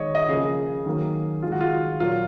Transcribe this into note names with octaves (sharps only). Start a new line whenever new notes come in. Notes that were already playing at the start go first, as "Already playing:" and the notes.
Already playing: D#3 G#3 C#5 D#5
D#5
C#3 F3 A#3 G#4
D#3 F#3 A#3
D#3 G#3 F4
F#4
F4
A#2 F#3 A#3 F4